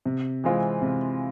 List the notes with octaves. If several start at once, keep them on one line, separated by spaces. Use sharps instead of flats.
C3
E3 G#3 C4 F4
C3